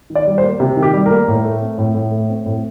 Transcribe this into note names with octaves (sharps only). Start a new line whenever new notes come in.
D#3
D5
G3
C5
A#3
C3
D#3
G4
G3
A#4
A#3
A2
A3
C4
A2
A2
A3
C4
A2